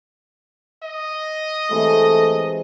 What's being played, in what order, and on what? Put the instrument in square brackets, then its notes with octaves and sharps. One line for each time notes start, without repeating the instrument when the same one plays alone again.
[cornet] D#5
[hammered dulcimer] C3 E3 G#3 [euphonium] A3